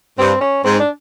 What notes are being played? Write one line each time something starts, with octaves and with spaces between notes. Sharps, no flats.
G2 C4
C#4
G#2 C4
D4